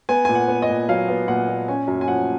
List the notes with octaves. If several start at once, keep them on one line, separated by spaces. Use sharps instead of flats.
B3 G#5
A#2 G#5
F#5
B3
D#5
A#2
F#3 F5
B3
A#2 F#5
A#2
C#4 G#5
F#2
G#5
F3 F#5